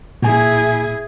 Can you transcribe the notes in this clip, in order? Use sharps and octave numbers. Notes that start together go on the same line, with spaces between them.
A#2 E4 G#4 G#5